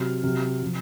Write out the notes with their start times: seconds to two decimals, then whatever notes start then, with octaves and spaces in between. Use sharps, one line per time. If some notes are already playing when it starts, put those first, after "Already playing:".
Already playing: C3 F#3 F6
0.23 C3 F#3
0.62 C3 F3